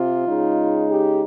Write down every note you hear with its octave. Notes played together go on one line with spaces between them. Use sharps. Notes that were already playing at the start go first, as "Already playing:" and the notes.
Already playing: C3 F4
C#3 G#3 D#4
G4